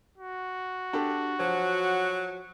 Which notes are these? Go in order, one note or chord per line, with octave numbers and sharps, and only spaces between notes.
F#4
D4 G4 A4
F3 F#3